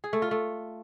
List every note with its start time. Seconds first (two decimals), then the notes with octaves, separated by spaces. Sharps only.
0.04 G#4
0.13 A3
0.22 F4
0.31 A3